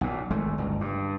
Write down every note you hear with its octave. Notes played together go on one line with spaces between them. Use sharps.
B1 A#2
G#1 G#3 A3
G1 C#2
G2